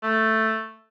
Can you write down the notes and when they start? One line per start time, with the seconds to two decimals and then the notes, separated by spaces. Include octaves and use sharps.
0.03 A3